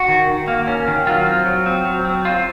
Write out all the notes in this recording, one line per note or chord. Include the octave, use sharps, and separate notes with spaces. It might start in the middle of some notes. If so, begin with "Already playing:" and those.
Already playing: F#4
D#3
D#3
A#3
C#4
D#3
F#3 F4
C4
F#3
C4
F#3
C4
C4 F4